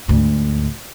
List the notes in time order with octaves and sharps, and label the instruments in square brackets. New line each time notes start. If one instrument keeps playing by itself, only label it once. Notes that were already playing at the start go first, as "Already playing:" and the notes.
[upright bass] D2 G#2